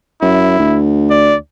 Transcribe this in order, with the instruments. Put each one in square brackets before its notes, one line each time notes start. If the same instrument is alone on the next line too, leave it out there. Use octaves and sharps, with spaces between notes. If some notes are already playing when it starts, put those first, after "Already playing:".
[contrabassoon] F#2 [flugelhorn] E4
[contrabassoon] D2
[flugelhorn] D5